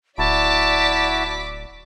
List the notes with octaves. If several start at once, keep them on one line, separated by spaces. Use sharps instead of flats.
D1 E4 F#4 D5 A5 D6 B6